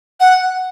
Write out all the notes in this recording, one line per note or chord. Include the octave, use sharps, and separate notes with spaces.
F#5